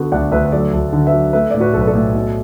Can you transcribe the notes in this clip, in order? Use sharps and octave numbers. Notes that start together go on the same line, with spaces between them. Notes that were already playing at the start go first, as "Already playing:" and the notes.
Already playing: D3 B3 F#4 A4
D2 D5 F#5
D2 B4 E5
B4
F#3 A4 D5
D2
D3
B4 E5
F#3
A3 B4 E5
A2 D5
F#4 B4
B1 A4
B4
A4 D5
A2
B2